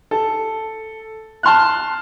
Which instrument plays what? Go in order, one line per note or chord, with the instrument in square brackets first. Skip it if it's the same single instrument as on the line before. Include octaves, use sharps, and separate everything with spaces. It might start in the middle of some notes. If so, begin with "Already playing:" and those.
[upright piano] A4
A5 C6 F6 F#6